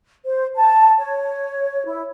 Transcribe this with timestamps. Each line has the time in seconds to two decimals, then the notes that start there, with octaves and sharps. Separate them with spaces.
0.25 C5
0.55 A5
0.99 C#5
1.85 E4